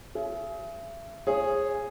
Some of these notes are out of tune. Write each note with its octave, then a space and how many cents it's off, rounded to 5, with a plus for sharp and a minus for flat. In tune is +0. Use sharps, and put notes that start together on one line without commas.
G#4 +25 E5 +35
G#4 -5 C#5 -45 F5 -40